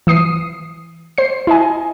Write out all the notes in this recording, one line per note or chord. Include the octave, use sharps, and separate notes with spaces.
E3 D#6 C7
C5 C7
E4 D#5 G#5